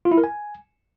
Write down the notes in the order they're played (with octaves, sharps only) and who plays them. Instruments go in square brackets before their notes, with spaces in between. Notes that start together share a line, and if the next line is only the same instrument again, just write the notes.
[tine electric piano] F4
E4
A#4
G#5